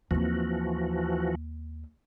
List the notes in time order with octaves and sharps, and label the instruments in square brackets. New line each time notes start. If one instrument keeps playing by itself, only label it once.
[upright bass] D#2 C4 [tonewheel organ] E3 F3 F#4